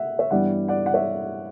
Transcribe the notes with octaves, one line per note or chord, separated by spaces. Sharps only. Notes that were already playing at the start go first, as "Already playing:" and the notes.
Already playing: E5 F#5
C#5 E5
G2 E3 G3 B3 D5 F#5
D5 F#5
F#5
C#5 E5